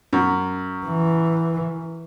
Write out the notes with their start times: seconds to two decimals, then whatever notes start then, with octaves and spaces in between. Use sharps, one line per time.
0.13 F#2
0.86 E3